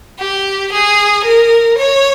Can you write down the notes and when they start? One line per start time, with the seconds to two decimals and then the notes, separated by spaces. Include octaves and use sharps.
0.20 G4
0.72 G#4
1.24 A#4
1.78 C#5